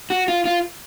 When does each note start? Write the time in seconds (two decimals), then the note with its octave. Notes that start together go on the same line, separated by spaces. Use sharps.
0.10 F#4
0.28 F4
0.45 F4